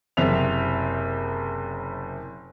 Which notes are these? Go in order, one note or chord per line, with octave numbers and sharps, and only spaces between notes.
F#1 C3 C4 C5 E5 F7